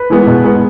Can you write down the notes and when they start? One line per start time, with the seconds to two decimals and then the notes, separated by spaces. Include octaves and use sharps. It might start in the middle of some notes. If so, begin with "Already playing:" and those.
Already playing: B4
0.10 E3 G#3 B3
0.27 B2
0.44 G#3 B3